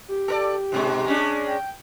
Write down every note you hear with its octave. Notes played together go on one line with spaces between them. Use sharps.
G4
A4 A#4 D5
G#2 B2 G#3
G#3 C#4 D4
G5